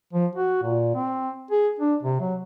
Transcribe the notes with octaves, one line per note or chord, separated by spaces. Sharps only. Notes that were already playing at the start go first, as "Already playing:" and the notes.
F3
F#4
A#2
C4
G#4
D4
C3
F#3